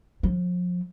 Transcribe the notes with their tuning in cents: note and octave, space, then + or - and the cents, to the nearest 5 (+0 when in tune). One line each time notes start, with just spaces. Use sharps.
F3 +40